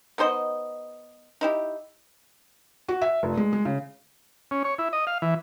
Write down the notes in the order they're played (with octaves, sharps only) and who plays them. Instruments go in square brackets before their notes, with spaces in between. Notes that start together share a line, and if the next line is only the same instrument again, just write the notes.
[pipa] B3 D#4 C5 D#5
D#4 E4 G4
[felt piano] F#4
E5
F1
G#3
G#3
C#3
[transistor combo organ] C#4
C#5
E4
D#5
F5
E3